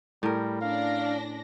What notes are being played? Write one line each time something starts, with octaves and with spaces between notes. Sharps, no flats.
A2 G3 A#4
C#4 D4 F5 A#6